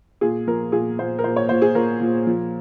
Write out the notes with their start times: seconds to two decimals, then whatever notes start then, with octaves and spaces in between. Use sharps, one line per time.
0.21 A#2 G#4
0.47 F3 A#4
0.72 A#2 G#4
0.99 A#2 C5
1.19 A#4
1.24 A#2 C5
1.36 C#5
1.49 A#2 C5
1.62 G#4
1.75 A#2 A#4
2.00 A#2
2.27 F3